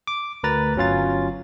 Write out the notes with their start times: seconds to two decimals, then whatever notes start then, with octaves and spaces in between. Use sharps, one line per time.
0.07 D6
0.43 D2 A#4 B4 A#5 A6
0.76 G1 F#3 C#4 F4 A6